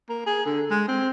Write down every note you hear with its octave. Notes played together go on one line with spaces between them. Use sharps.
A#3
G#4
D3
G#3
C4